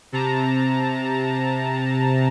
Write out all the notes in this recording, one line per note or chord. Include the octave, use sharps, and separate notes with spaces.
C3 A5 A#5